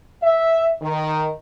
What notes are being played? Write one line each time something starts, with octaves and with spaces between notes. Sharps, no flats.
E5
D#3